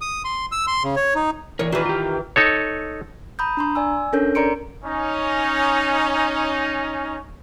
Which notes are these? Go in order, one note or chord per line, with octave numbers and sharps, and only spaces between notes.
D#6
C6
E6
C6
C#3
C#5
D#4
D#2 E3 A#4 C#5
D#3 E3 F#4 G#4 B4
F4 G4
D#4 A4 C#5
A#5 B5 D#6 G6
D4 A#5 C6
D5 G#5 E6
C#4 D4 A4 A#4 C#5 G6
A#4 D5 A#5 C6 C#7 D7
C#4 D#4